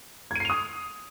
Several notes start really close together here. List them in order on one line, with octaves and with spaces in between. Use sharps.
G#6 D#7 C7 F7 D#6